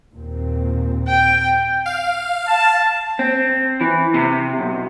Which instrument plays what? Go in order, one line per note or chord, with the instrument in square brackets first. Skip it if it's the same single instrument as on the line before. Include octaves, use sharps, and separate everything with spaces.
[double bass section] D#2 A#2 C4
[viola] G5
[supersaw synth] F5
[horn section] A5
[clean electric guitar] C4
E3
C3
B1